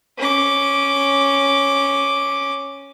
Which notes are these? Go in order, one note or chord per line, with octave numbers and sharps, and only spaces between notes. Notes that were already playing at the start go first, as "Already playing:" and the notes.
C#4 D6